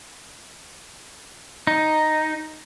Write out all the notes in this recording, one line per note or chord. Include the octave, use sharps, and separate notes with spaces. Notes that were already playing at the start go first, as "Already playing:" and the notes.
D#4